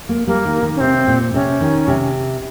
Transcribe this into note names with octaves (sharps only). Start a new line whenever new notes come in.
A#3
G3 A#3
D#3
D#3
C#4
C3 C4
A#2
C3 C#4
D#3
C3